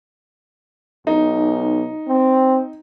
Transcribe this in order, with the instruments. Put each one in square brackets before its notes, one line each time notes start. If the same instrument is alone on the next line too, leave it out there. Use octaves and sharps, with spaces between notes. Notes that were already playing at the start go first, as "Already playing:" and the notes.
[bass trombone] B1 [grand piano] D#4
[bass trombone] C4